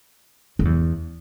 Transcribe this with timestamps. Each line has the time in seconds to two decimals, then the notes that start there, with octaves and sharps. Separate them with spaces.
0.59 F2
0.65 E2